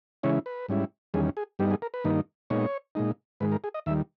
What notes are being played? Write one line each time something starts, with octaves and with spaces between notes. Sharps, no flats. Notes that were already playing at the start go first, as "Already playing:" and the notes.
C#3 E3 G#3 C#4 E4 C#5
B4
G#2 G3 C#4 E4
E2 D#3 G3 C#4 G#4
G#4
G2 G3 B3 D#4 G4
G#4
A#4
B4
G2 D#3 A#3 D#4
A#2 G#3 B3 D#4 C#5
A#2 G#3 D#4
G#2 D#3 G#3 B4
A#4
G#4
D#5
D#2 D#3 G3 E5